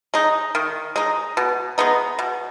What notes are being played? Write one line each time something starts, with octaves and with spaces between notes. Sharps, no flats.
G#3 D#4
D#3
G#3 D#4
B2
G#3 B3 D#4
B2